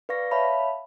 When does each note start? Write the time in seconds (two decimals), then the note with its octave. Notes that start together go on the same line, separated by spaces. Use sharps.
0.09 B4 D5 F5 C#6 A#6
0.31 C#5 E5 F5 A5 B5